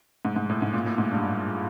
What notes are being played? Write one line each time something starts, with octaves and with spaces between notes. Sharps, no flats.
G#2
G#2
A2
G#2
A#2
A2
G#2
G2